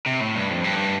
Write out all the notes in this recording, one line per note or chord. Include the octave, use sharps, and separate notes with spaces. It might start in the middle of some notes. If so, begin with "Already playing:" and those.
C3
A2
G2
F2
G2